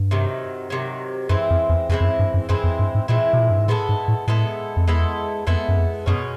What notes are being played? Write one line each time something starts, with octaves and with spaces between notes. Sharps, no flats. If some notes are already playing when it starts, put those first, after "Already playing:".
Already playing: G2
C3 D#3 F#3
C3 D#3 F#3
F#2 E3 G#3 C4 E4
F2
E2
F2 E3 G#3 C4 E4
F2
F#2
G2
F#2
F#2 E3 G#3 C4 E4
F2
G2
G#2
A#2 E3 G#3 C4 E4
B2
A#2
G2
G#2
A2 G#3 B3 E4 A4
G#2
A2
A2 G#3 B3 E4 A4
F2
E2 G#3 B3 E4 A4
F2 G#3 B3 E4 A4
F#2
F2
F#2 B2 G#3 C#4